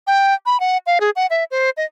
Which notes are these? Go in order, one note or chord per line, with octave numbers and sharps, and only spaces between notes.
G5
B5
F#5
F5
G#4
F#5
E5
C5
D#5